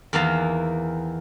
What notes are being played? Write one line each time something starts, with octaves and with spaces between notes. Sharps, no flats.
E2 D#3 E3 A#3 F5 A5